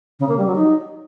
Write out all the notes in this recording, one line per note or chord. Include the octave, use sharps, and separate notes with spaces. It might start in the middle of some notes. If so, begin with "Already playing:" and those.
C#3
A#3
G3
F#3
D#4